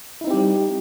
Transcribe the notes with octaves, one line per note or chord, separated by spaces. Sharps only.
G3 C4 D#4 E4 G4